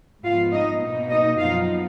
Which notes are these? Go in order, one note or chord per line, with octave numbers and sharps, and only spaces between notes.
G#2 F3 B3 F4 F5
D#4 D#5
B2 A#3 D#4
D#4 D#5
F#2 F3 B3 D#4 F4 F5